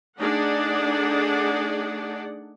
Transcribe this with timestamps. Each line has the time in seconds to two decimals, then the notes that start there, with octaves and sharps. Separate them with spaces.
0.18 A3 D4 D#4 G#4 D5 F#5